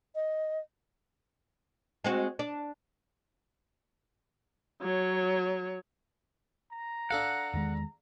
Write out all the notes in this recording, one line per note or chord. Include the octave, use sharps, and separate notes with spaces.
D#5
G#3 C4 F#4
D4
F#3 C#5
A#5
D4 A4 F5 F#5
E2 D#3 G#3